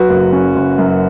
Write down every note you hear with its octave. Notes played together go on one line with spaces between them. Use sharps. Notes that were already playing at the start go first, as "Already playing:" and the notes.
Already playing: F#3 F#4 B4
F#1
C#4
F#1
F#2